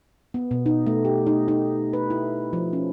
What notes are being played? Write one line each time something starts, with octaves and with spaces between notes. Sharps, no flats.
B3
B2
D#4
A3
G4
D#4
D#4
B4
E4
F3
C#4